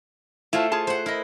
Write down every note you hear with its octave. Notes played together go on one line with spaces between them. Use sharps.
A3 E4 F4 C5 A5
F4 G#4 A5
C5 F#5
E4 A#4 D#5